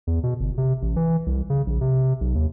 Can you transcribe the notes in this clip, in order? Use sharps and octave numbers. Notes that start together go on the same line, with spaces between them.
E2
B2
G1
C3
A1
E3
C2
C#3
A#1
C3
B1
D#2